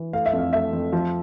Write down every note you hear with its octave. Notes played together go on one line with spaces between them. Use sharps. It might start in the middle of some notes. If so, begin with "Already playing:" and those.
Already playing: E3
A3 F5
E5
F2
F5
A3 E5
F2
F3